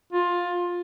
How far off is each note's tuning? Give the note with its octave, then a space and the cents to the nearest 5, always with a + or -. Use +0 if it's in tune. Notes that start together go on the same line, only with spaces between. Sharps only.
F4 +15